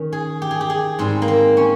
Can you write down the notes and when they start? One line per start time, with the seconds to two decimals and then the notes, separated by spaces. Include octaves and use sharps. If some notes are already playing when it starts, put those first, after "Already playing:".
Already playing: D#3 C#4
0.13 G#4
0.42 G4
0.51 G#4
0.61 G4
0.70 G#4
0.99 G#2 G3 C4
1.22 A#3
1.28 C4
1.57 C#4